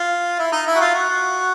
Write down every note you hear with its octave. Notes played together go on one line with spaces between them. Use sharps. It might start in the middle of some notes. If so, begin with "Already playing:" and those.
Already playing: F4
E4
D#4
E4
F#4
F4
F#4